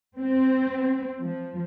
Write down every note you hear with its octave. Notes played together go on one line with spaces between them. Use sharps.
C4
F3